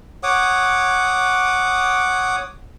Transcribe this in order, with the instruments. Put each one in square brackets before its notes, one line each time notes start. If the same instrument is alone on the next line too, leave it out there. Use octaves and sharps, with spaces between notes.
[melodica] C#5 F#5 D6 D#6